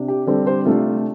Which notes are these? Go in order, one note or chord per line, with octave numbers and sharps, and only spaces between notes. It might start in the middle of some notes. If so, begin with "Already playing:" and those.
Already playing: C3 D4
G4
D3 G3 C4 A4 D5
G4 C5
C3 A3 D4 F4 A4